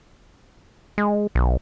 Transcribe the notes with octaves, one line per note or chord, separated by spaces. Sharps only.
G#3
B1